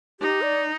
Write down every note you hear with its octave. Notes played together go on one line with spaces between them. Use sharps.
D#4 G4
D5